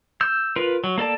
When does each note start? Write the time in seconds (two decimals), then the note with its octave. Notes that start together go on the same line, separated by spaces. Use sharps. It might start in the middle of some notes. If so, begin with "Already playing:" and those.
0.21 E6 G6
0.56 F4 A#4 B4
0.84 F#3
0.98 A#3 A4 D5 A5